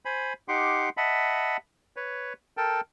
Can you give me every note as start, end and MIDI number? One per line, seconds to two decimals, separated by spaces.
0.05 0.33 72
0.05 0.33 80
0.05 0.33 83
0.48 0.89 63
0.48 0.89 67
0.48 0.89 78
0.48 0.89 84
0.48 0.89 86
0.97 1.57 75
0.97 1.57 76
0.97 1.57 78
0.97 1.57 81
0.97 1.57 83
1.96 2.33 71
1.96 2.33 73
2.57 2.81 69
2.57 2.81 70
2.57 2.81 79
2.57 2.81 81